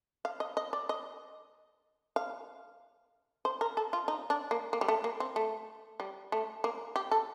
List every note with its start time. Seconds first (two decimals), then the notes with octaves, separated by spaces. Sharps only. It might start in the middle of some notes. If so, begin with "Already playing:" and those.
0.25 F5
0.40 D#5
0.57 D#5
0.73 D5
0.89 D#5
2.16 F5
3.45 C5
3.61 A#4
3.77 A4
3.93 F4
4.08 D#4
4.30 D4
4.51 A#3
4.73 A#3
4.81 G3
4.88 A3
5.04 A#3
5.20 C4
5.36 A3
6.00 G3
6.32 A3
6.64 A#3
6.96 G4
7.11 A4